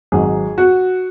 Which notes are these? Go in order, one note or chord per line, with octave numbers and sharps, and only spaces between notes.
G#1 G#2 F#3 G#4
F#4